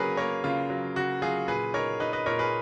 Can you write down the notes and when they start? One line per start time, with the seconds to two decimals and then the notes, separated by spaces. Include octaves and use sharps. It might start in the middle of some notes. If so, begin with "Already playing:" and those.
Already playing: C#3 F#3 A#3 G#4 A#4 B4 C#5
0.17 A#3 A#4 C#5
0.44 C#3 F4
0.70 F#3
0.96 C#3 F#4
1.22 F#3 F4 G#4
1.48 A#2 G#4 B4
1.74 D#4 A#4 C#5
2.00 D#4 B4 D#5
2.13 B4 D#5
2.26 A#2 A#4 C#5
2.39 G#4 B4